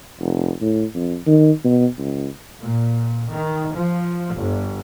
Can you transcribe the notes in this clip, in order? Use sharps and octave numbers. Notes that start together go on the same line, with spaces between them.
F1
A2
F2
D#3
B2
C#2
A#2
D#3
F3
G1